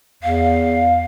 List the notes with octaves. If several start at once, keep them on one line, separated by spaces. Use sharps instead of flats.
E2 F5